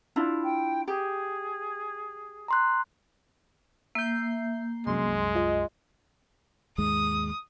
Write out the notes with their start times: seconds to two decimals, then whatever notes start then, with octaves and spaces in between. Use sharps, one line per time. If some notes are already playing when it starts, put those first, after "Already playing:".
0.16 D4 E4 F4
0.43 G5
0.88 G4 G#4
2.48 A#5 C6 F#6
3.95 A#3 E5 G6 C7
4.87 C2 F#2 G#3 C6
5.35 F4 D#5
6.78 D#2 G#2 G#3 D#6